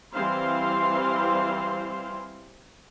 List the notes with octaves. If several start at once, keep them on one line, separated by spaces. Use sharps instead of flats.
E3 G3 C4 C5 F5 C6